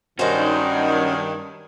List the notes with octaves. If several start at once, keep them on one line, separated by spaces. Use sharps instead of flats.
G2 D#3 C#4 D#4 F#4 C5